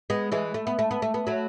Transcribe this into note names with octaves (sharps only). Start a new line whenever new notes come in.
G#3 B3
E3 G#3
A3
B3
A3
B3
A3
B3
F#3 A3